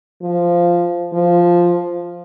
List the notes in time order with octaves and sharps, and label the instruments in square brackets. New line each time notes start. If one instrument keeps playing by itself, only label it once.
[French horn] F3
F3